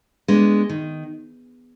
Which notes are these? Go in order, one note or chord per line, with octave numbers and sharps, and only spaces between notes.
G#3 B3 D4
D#3